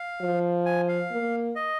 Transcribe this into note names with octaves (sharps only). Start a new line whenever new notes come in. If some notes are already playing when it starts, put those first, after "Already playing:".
Already playing: F5
F3
G#5
F5
A#3
D#5